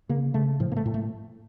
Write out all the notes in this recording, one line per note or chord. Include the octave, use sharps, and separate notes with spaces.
C#3 A#3
C#3 A3
A2 F3
A#3
A3
A2
A3